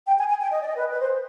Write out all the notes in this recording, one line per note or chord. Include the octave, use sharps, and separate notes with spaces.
G5
G#5
G#5
G5
D#5
D5
D#5
B4
B4
C5